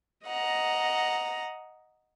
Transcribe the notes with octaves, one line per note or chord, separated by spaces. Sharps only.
D#5 F#5 A#5